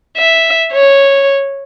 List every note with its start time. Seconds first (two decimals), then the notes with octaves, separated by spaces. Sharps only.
0.17 E5
0.72 C#5